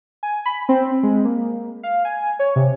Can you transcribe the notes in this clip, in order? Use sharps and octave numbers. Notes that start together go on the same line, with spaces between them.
G#5
B5
C4
G#3
A#3
F5
G#5
C#5
C3